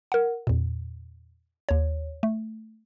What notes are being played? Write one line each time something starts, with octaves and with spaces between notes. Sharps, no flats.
A#4 F#5
E2 A#2
D#2 C#5
A3